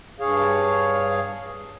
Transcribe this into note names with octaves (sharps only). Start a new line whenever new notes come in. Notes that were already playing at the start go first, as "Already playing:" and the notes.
G2 G#4 C#5 F5